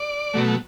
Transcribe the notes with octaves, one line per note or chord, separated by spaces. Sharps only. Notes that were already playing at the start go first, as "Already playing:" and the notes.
Already playing: D5
B2 F#3 A3